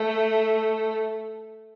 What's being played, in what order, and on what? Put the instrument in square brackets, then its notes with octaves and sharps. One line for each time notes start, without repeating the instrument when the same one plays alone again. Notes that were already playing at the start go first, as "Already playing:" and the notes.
Already playing: [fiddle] A3